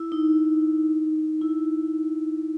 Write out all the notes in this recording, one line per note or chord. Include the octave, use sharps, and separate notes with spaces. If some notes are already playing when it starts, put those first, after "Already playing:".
Already playing: E4
D#4
E4